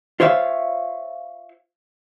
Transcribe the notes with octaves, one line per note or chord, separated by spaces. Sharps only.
F4 C5 C#5 E5 F5